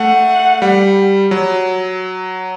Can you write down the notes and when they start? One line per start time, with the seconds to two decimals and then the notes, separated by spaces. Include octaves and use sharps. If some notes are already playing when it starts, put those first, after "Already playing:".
Already playing: A3 F#5
0.62 G3
1.31 F#3